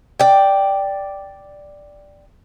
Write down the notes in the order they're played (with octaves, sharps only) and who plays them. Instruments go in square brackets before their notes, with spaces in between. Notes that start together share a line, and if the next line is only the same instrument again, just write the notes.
[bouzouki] D5 G5